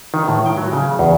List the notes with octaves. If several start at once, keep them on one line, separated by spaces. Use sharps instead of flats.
D#3
A2
G5
F#3
C#3
E2